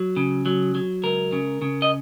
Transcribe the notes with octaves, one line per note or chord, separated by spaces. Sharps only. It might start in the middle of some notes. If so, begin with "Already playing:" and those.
Already playing: F#3
C#3
F#3
F#3
C#2 A#4
C#3
C#3
D#5